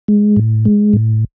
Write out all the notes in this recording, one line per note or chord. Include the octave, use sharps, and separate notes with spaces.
G#3
A2
G#3
A2